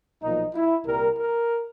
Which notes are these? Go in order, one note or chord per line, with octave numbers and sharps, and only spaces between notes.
B1 A#2 F3 D#4
E4
C2 A#2 G3 A#4
A#4